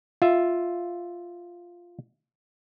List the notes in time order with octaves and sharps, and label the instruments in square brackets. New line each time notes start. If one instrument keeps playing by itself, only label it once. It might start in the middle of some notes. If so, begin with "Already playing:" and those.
[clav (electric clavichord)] F4 E5